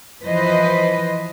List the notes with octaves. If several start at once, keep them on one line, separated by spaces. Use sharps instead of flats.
E3 F3 B4 C5 D#5